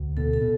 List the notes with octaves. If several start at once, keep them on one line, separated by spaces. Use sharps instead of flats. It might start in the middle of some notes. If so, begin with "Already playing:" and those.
Already playing: D2
B2 A4
A4
B2